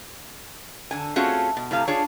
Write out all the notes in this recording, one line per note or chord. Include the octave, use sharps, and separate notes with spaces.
D3 G#5
A3 C4 C#4 F4 F#4 G#4
B2
A2 C3 F5
D4 F4 G#4 C#5